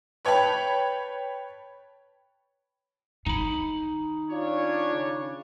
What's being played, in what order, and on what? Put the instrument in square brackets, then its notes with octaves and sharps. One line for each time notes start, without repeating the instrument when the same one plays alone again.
[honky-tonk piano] B4 C#5 G5 A5 B5
[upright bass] D#3 [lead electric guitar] D#4 B5
[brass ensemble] C#4 D4 C#5 [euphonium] F4
[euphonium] C#3